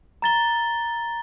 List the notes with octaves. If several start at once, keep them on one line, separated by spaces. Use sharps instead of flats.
A#5 A6 G7